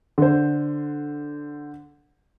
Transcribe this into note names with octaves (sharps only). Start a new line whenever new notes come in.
D3 C5